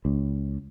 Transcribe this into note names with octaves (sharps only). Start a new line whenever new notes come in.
C#2